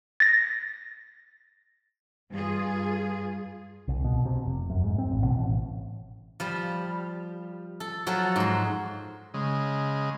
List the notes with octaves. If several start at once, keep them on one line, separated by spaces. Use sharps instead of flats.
A6 A#6
G2 F4 G#4
C2
B2
C3
F1
F#2
G#2
C4
A1
B2
A1
F3 G3
A4
F3 F#3 F#4 A4
G#2 C6
C#3 G#3